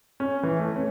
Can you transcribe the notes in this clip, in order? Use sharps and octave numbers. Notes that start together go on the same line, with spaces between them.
C#4
E3
A3
C#4